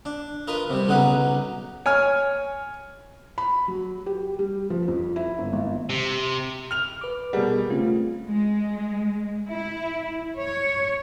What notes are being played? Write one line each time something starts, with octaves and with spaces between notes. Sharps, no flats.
D4
F4 A#4 B4 D#5
C3 G3
B1 C#3 F#3 D#4 B4
C#5 G#5 F6
B5
F#3
G4
G3
F3
F2
E4
G1
G#1
C3
F6 F7
B4 D6
B2 G3 G#4 A#4 F#5
C#3 A3 C4 F4
G#3
E4
C#5